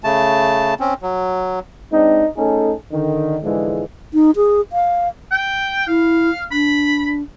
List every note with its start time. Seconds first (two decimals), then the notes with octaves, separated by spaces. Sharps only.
0.04 C#3 A3 A5
0.80 C4 C#4
1.02 F#3
1.92 G#3 C4 D4 D#4
2.37 A3 C#4 D#4 G#4 A4
2.92 D3 D#3
3.43 G#2 D3 E3 F3 G#3
4.14 D#4
4.36 G#4
4.73 F5
5.31 G5
5.88 E4 F5
6.51 D4 B5